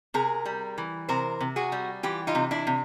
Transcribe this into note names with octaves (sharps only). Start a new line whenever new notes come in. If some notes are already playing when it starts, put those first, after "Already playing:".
C3 G#4 A#4
G3
E3
C3 A#4 C5
C3
F#4 G#4
G3
E3 F4 G4
D#4 F4
C3
D4 E4
C3